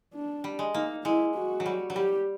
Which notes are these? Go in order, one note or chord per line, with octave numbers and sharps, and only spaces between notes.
D4
G3
G#3
A#3 D#4
G#3 E4
F#4
F#3
G3
F#3
G3 G4